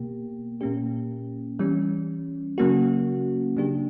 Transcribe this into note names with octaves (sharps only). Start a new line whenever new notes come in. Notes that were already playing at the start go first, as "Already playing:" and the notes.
Already playing: B2 A#3 G4
A#2 A#3 C#4 G4
E3 G3 C#4
C#3 F#3 A#3 C#4 F#4
C#3 F#3 A#3 D4 G4